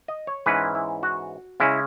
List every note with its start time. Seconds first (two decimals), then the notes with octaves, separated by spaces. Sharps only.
0.08 D#5
0.27 C#5
0.46 G#2 E3 G#3 C#4 B4
0.75 E4
1.03 F#4
1.60 C#3 G#3 C#4 E4